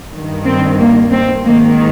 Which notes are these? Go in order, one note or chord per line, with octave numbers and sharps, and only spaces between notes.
G2 D#3
C4
A#3
C4
G#2 D#3 A#3